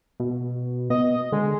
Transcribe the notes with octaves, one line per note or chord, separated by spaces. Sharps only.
B2
B2 D#5
D3 G#3